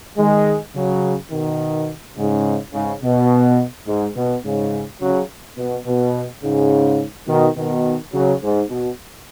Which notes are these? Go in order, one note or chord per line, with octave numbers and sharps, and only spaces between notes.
D#3 G#3
C#3 F#3
B2 D#3
G#2 C#3
G#2 C#3
B2
G#2
B2
G#2 C#3
C#3 F#3
B2
B2
G#2 C#3
B2 D#3
B2 D#3
C#3 F#3
G#2
B2